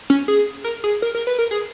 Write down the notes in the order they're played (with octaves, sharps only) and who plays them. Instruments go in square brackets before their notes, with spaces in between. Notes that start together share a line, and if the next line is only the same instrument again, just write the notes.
[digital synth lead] C#4
G#4
A#4
G#4
A#4
A#4
B4
A#4
G#4